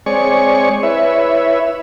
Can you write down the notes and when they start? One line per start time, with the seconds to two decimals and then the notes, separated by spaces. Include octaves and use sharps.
0.06 G#3 C4 G#4 C#5 D5 C#6
0.83 E4 B4 C#5 E5